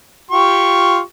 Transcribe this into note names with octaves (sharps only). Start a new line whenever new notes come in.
F4 G4 C#6